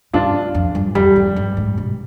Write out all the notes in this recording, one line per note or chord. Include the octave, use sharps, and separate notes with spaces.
G2 D4 F4
F2
G2
F2 G3
F2
G2
G#2
B2